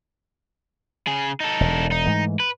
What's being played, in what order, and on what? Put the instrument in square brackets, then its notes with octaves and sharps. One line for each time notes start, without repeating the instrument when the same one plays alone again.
[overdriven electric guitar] C#3 G#4
D#4 A4
[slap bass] E1
[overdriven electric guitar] D#4
[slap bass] G#2 E3 A3
[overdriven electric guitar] B4